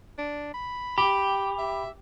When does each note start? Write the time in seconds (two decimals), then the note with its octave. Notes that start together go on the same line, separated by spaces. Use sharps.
0.18 D4
0.54 B5
0.98 G4 G5 B5
1.58 E5